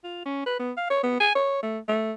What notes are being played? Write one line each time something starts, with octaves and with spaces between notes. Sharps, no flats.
F4
C#4
B4
B3
F5
C#5
B3
G#5
C#5
A3
A3